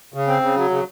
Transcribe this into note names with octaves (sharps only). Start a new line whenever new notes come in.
C#3
C4
C#3
F#3
C#3